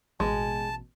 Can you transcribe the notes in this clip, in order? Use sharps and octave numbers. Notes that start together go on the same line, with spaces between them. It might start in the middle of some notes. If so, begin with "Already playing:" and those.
A1 B2 G#3 A5